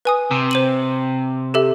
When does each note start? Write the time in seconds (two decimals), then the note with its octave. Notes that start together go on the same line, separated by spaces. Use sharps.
0.05 B4 G#5 D#6
0.31 C3
0.51 C5 D#7 F#7
1.54 G4 A4 E5